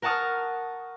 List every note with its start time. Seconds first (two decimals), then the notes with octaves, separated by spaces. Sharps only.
0.02 A#4 F#5 A5 C#6 D#6 F6